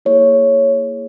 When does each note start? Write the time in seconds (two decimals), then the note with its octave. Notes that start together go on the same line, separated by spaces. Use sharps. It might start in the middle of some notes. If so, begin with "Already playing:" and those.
0.05 A#3 E4 G#4 C#5